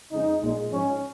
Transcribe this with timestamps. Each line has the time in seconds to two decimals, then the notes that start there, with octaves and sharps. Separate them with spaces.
0.12 F2 C#3 G#3 D#4
0.42 A#1 A#2 G#3
0.71 G#2 F3 G#3 C#4